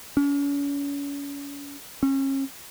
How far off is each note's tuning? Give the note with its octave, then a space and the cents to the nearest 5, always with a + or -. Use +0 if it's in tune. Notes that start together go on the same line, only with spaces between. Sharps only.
C#4 +35
C#4 -35